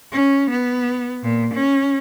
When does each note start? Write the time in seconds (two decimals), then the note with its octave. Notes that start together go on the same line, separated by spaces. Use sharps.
0.12 C#4
0.50 B3
1.23 A#2
1.54 C#4